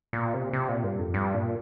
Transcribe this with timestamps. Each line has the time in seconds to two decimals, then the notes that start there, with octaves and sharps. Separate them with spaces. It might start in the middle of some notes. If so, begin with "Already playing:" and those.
0.13 A#2
0.33 C3
0.53 C3
0.69 A#2
0.84 G2
0.99 F2
1.14 G2
1.34 A#2